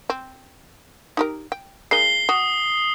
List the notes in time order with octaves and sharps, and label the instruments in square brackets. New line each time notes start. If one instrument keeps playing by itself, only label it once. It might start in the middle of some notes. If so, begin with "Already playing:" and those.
[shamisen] C4
D#4 G4 A#4
G5
[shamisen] G#3 A#3 D#4 [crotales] C7 G7
[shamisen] F#4 [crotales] D#6